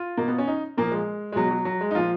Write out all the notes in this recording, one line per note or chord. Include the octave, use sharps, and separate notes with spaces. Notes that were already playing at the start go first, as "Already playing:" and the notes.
Already playing: F4
B2 A#3
B3
C#4
D#4
A#2 F3 A#3
G#3
G#3
B2 F#3
F#3
F#3
G#3
D#4
A#2 F3 F4